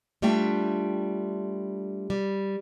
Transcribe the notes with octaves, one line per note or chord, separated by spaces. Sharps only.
G3 A3 D4 F4 E5 G5
G3